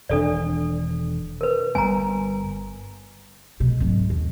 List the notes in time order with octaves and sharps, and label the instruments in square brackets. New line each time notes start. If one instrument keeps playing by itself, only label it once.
[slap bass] E1 D#3 [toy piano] D4 A4 D5
[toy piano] A#4 B4
[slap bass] G1 G3 B3 [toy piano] G#5 A#5
[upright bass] B2 G#3
G#1 F#3
D#2